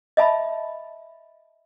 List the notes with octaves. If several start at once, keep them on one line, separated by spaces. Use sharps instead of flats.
D#5 E5 A5 B5